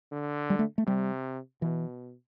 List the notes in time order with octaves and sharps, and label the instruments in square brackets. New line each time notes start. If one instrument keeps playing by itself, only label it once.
[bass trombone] D3
[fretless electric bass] G3
A3
A3
[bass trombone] C3 [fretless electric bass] G3
[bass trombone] B2 [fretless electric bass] E3